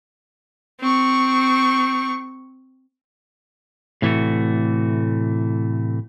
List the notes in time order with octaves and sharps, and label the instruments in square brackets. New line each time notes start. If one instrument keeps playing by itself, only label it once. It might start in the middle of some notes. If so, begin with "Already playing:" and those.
[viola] C4 C#6
[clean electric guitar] A2 C3 E3 G#3 A3 F#4